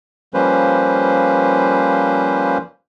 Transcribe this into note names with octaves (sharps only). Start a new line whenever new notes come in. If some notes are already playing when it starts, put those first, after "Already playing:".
F3 G3 A#3 C#4 B4 C5